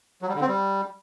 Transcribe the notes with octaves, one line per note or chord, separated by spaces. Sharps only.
F#3
G3
D3
C4
G3